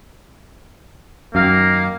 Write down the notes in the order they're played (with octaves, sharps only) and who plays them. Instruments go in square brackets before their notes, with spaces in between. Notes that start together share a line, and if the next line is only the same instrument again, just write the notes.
[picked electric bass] F#2 [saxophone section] D#3 A#4 F5 [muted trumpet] A#3